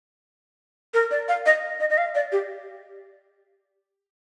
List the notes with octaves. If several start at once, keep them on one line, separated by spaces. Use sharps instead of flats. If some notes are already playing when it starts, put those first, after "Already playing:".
A#4
D5
F5
D#5
D#5
D#5
F5
D5
G4